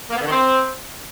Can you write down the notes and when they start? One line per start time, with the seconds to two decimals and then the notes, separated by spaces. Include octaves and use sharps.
0.10 A#3
0.16 B3
0.21 D3
0.26 D#3
0.31 C4